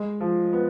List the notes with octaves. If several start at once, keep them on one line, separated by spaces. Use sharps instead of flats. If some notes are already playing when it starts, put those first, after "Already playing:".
Already playing: G#3
F3
B3